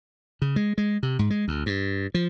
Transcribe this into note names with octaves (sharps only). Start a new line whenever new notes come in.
C#3
G#3
G#3
C3
G#2
G#3
D2
G2
F3